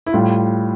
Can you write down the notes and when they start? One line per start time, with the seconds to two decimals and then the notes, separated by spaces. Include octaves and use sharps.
0.06 E4
0.13 A2 G3 F4